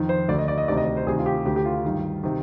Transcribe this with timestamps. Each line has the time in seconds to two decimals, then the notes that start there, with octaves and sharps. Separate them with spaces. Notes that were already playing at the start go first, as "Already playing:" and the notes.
Already playing: F2 D#3
0.09 C5
0.28 D2 D3 D5
0.38 D#5
0.48 D5
0.58 D#5
0.68 D2 C3 D#3 D5
0.77 D#5
0.87 D5
0.97 C5
1.07 D2 C3 D#3 G#4
1.19 F4
1.26 G4
1.45 D2 D3 G4
1.56 G4
1.65 F4
1.85 G2 D#3
2.23 C3 D#3